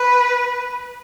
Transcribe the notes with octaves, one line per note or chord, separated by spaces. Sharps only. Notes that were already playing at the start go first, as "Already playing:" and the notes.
Already playing: B4